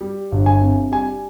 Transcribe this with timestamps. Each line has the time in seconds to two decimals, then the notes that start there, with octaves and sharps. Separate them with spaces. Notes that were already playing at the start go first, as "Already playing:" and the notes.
0.01 G3
0.32 G1
0.46 G#5
0.61 C3
0.92 G3 G#5